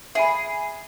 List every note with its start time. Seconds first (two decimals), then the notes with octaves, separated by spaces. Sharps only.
0.15 G#4 E5 G#5 B5